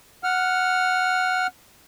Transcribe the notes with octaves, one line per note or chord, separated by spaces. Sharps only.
F#5 F6